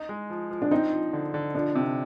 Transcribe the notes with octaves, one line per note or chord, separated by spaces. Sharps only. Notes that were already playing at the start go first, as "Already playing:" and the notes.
Already playing: D#4
G#3
F3
F3
D4
C4 D#4
F3
D3
D3
F3 D4
C3